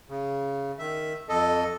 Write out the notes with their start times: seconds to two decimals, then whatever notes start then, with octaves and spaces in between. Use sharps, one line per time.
0.09 C#3
0.79 D#3 E5
1.29 F2 A4 D#5